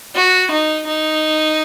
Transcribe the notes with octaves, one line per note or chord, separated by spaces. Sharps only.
F#4
D#4
D#4